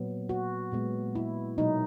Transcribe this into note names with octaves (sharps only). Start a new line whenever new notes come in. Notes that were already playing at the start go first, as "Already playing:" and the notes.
Already playing: A#2 F#3 B3
F#4
A#2 G#3 B3
E4
B2 F#3 A#3 D#4